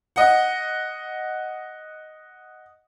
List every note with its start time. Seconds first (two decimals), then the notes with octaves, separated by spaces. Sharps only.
0.16 D#5 F#5